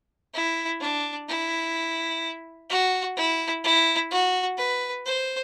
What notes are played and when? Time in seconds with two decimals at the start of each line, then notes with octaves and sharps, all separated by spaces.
0.34 E4
0.81 D4
1.28 E4
2.70 F#4
3.16 E4
3.64 E4
4.11 F#4
4.58 B4
5.05 C5